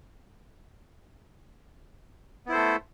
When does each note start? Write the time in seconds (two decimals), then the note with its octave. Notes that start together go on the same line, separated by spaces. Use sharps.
2.46 B3
2.49 E4
2.52 C5
2.54 A4
2.57 A3